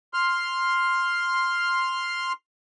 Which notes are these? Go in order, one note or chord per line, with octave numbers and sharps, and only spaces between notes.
C6 F6